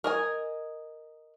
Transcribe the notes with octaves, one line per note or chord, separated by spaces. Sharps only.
A#4 D#5 G#5